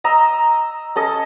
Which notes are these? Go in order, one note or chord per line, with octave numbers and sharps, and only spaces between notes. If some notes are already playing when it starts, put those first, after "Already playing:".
D#5 A#5 E6
C#4 A4 D#5